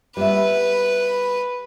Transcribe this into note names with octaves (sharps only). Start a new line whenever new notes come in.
G3 B3 B4 E5